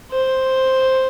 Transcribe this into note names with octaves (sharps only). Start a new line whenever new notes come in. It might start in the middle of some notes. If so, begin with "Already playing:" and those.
C5